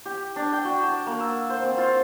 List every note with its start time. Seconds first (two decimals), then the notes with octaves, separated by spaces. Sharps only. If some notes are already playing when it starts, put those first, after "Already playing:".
0.06 G4
0.36 D4
0.53 G5
0.65 F#4
0.83 A5
1.06 A#3
1.20 E6
1.50 C5
1.64 C4
1.78 F4